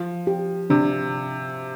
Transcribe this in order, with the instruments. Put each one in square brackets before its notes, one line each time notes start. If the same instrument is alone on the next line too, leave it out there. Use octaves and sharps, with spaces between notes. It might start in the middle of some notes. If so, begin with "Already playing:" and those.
Already playing: [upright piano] F3
[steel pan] G4
[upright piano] C3 [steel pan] D4